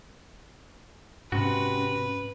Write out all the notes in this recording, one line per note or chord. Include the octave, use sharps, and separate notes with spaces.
G#2 C3 C#4 F#4 B4